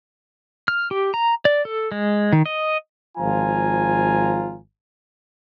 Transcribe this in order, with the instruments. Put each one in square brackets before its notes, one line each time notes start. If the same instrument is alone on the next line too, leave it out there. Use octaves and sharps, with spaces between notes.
[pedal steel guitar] F6
G4
A#5
D5
A4
G#3
D#3
D#5
[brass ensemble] G#1 F3 F4 G#5 A#5